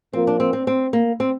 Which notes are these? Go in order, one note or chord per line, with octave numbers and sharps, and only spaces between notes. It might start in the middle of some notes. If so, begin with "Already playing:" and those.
F3 A#3 C4 F4 A#4
D4
C4
C4
C4
A#3
C4